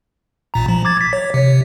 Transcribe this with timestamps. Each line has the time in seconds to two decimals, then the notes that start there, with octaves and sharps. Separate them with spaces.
0.54 A1 A#2 A#5
0.68 F3
0.85 D6 G#6 A6
1.01 B6
1.13 C#5
1.34 C3